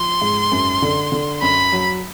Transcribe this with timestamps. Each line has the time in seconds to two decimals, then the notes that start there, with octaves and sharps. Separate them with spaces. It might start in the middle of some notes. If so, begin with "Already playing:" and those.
Already playing: F3 C6
0.22 G#2
0.52 F#2
0.82 D3
1.12 D3
1.42 F#2 B5
1.72 F#3